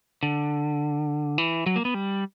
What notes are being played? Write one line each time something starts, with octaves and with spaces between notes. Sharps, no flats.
D3
E3
F#3
A#3
B3
G3